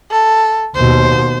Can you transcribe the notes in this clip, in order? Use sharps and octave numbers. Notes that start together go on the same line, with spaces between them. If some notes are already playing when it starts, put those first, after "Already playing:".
A4
D#2 B2 C5